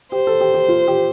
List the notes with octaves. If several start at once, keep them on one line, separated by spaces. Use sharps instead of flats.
G4 C5
A4
G4
G4
F4
G4